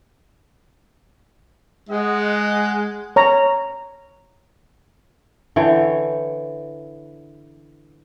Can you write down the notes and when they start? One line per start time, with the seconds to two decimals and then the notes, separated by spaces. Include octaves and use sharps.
1.89 G#3 D#5 F#5
3.16 C#5 A#5
5.56 D3 E3 C#5 G5